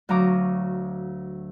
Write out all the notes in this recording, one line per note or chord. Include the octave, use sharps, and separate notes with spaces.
D2 F#3 F5 A#5 D6 D#6